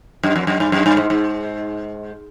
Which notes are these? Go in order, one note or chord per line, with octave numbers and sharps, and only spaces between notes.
F#2
F2
F#2
G2
F#2
G2
G#2
G#2